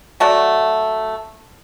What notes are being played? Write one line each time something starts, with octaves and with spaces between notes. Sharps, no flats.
F#3 A3 F#4 D5